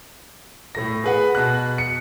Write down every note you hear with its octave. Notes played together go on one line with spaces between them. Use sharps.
A2 A3 A#6
G#4 B4 F#5
B2 F#6
C#7